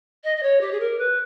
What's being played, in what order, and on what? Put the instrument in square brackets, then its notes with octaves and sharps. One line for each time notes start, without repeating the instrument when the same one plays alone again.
[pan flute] D#5
D#5
C#5
G4
G#4
A#4
B4